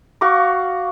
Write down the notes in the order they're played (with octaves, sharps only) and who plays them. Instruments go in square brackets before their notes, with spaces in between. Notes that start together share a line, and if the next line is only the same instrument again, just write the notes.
[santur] F#4 F5 C#6 D6